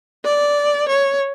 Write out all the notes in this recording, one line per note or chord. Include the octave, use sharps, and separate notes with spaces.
D5
C#5